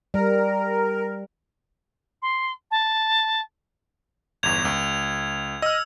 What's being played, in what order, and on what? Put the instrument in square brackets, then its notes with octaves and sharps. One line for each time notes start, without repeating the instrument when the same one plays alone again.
[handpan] G3 [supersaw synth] A#4
[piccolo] C6
A5
[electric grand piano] G1 E2 [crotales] G#6 F7
[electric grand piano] C#2
[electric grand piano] D#5 F6 [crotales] E6